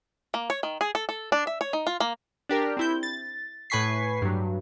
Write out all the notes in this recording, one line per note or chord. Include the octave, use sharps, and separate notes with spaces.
A#3
C#5
D#3
G#4
A4
A4
D4
E5
C#5
D#4
F4
A#3
D4 G4 A#4
C4 E4 G6
A6
A2 B4 G#5 C#6 B6 C7
G2 F#3